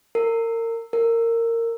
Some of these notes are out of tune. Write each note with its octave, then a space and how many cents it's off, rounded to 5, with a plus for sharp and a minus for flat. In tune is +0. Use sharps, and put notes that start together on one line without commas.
A#4 -30
A#4 -20